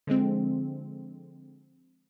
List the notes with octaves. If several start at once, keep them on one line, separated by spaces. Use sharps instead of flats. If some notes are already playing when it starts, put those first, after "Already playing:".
D3 F3 G#3 C4